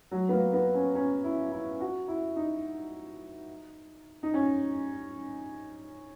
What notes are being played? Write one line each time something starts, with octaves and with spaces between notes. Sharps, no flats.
F#3
B3
A#3
B3
C#4
C#4
E4
E4
F#4
E4
D#4
D#4
C#4